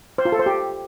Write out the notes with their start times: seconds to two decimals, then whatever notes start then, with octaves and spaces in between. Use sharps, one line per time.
0.18 C5
0.25 F4
0.32 A4
0.39 C5
0.46 G4